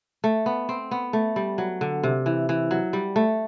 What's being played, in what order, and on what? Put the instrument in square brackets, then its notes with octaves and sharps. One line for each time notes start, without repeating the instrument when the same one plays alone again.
[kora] A3
B3
C4
B3
A3
G3
F#3
D3
C3
E3
E3
F#3
G3
A3